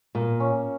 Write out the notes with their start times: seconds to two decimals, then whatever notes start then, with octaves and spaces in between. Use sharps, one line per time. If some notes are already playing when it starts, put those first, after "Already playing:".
0.15 A#2 A#3
0.40 C#4